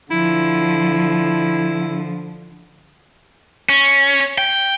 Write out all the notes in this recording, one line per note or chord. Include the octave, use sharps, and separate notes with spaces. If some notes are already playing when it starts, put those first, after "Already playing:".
D3 F3 E4
C#4
G5